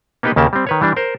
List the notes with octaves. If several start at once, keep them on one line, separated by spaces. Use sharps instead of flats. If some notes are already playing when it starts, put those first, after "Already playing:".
A#3 B3 D#4 G4 B4 D#5
D#2 C#3 A#3 G4 A5
G3 C4
D#3 B4 C#5
E3 G3 D4
A#4 C5